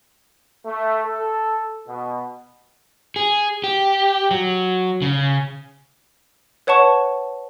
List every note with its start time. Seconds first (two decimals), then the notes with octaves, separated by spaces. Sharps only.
0.65 A3
1.05 A4
1.87 B2
3.16 G#4
3.64 G4
4.31 F#3
5.02 C#3
6.67 B4 C#5 F#5 A5 C#6